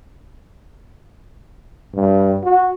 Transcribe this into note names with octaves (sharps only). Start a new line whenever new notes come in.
G2
F#4